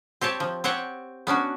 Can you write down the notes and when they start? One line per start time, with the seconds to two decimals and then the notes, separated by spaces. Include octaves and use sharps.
0.21 C4 G4 C#5 A5
0.40 F3
0.64 C4 G4 C#5 F#5 G5
1.27 B3 C#4 D4 F#4